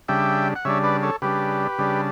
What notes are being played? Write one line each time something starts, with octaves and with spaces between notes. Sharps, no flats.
C#3 G3 D4 E5 G5
F#5
C#3 G3 D4 C#5 E5
B4 D5
A4 C#5
C#3 G3 D4 G4 B4
C#3 G3 D4